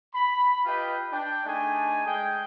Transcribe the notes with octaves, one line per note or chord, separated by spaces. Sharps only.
B5
F4 G4 B4 D#5 G5
D4 G5
A3 D4 D#4 G#4 G#5
G#3 G#4 G5